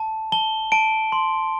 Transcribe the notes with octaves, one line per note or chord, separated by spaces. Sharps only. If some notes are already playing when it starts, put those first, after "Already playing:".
Already playing: A5
A5 G7
A5 D7
C6